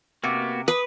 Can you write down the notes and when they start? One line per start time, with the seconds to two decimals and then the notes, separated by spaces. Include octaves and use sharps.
0.24 C3 A#3 B3 F#4
0.68 B4 D#6